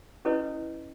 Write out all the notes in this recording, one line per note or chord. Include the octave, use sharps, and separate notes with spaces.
C#4 E4 A4 B4 C#5 D#5